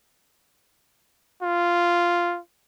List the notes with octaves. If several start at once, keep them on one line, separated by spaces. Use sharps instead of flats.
F4